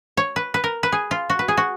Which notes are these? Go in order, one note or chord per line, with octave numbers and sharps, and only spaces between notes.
C#5
B4
B4
A#4
B4
G#4
F4
F#4
B4
G#4
F#4